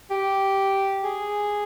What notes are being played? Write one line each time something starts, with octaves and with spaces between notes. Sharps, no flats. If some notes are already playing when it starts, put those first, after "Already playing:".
G4
G#4